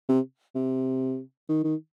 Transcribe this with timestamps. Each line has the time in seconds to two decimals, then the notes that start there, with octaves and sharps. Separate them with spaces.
0.09 C3
0.55 C3
1.49 D#3
1.64 D#3